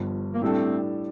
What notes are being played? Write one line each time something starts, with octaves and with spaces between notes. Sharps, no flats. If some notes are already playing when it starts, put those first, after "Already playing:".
Already playing: G1 G2 F3
A#3
A2 G3 A3 C4 D4 A4